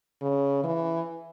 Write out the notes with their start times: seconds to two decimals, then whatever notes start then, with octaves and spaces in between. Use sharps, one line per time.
0.22 C#3
0.64 E3